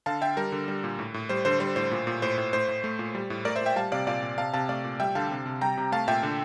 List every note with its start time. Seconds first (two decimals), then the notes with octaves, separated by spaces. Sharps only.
0.06 D3 F5 A5
0.21 D3 E5 G5
0.37 G3 A#4
0.52 D3
0.68 G3
0.84 A#2
0.99 A2
1.14 A2
1.29 G3 C5
1.45 D3 C5
1.60 G3 C5
1.76 A2 C5
1.91 A#2
2.07 A#2
2.22 A2 C5
2.38 A2
2.53 A2 C5
2.68 A2
2.84 A3
2.99 A#2
3.15 G3
3.30 A2
3.45 A3 A#4 D5
3.55 C5 E5
3.61 A#2
3.66 E5 G5
3.76 G3 F5 A5
3.92 C3 D5 F5
4.07 A#2 D5 F5
4.23 A#2
4.38 C3 F5 A5
4.53 C3 F5 A5
4.69 A3 D5 F5
4.85 A#2
5.00 G3 E5 G5
5.15 D3 F5 A5
5.31 C3
5.46 C3
5.61 G3 G5 A#5
5.77 C3
5.92 A3 F5 A5
6.08 A#2 E5 G5
6.23 D3